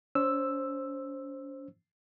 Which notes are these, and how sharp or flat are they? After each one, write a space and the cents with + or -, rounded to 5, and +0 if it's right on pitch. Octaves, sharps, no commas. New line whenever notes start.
C#4 +40 C5 +15 E6 +0